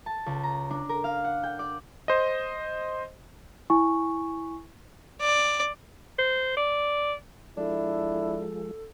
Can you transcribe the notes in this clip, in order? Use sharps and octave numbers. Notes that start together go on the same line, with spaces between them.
A5
C#2
A#5
D4
A#4
F5
F#5
G5
D5
C5 D#5
E4 G#5 C#6
D5
C5
D5
F3 G#3 D4 E4 A4